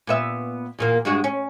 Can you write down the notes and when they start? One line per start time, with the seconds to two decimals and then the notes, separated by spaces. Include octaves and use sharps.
0.07 A#2 B3 E5
0.79 E2 A#2 A#3
1.05 G2 G#3 F#4
1.24 C#4